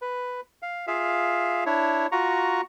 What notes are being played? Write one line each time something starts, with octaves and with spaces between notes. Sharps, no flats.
B4
F5
F4 G#4 E5 F5
D4 E4 C#5
F4 F#4 A#5 C#6